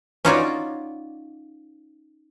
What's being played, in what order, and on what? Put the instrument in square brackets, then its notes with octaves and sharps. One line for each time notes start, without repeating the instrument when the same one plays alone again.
[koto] C#4 D#4 F4 F#4 C#5 D5